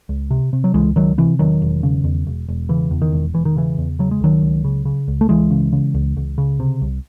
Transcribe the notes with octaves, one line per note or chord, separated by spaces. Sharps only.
C#2
C3
C3
F#3
C#2 E3 G#3
C#2 D#3 F#3
C3 E3
E1 D#3 F#3
E1
C#3
E2
E1
E1
C#3 E3
E2
D#3
E1
E1 E3
D#3
C#3 E3
E2
C#3 F#3
G#3
C#2 D#3 F#3
C#2
C#3
C#3
C#2
A3
C#2 E3 G#3
C#3
C#3
C#2
C#2
C#3
C3
C2